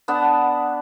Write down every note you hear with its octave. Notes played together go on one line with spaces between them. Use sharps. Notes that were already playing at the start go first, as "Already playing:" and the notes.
B3 D4 F#5 A5